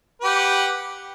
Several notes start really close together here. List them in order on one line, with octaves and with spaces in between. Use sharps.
B4 G4 F#5